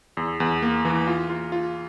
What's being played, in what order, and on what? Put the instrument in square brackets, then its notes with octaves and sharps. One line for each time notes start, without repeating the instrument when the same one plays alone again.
[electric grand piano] E2
E2
A#3
E3
F4
F4
F4